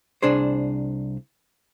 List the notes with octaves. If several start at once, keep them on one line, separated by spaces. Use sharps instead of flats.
C2 D4 G#4 C5